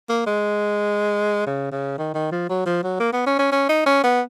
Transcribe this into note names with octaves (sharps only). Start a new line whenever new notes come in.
A#3
G#3
C#3
C#3
D#3
D#3
F3
F#3
F3
F#3
A#3
B3
C#4
C#4
C#4
D#4
C#4
B3